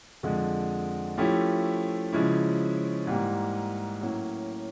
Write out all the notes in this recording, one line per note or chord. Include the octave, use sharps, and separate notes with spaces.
F2 D3 F3 G#3
F3 A3 C#4 E4 G4
C#3 F3 G#3 C#4 E4
G#2 E3 G3 A#3
A2 F#3 A#3 C#4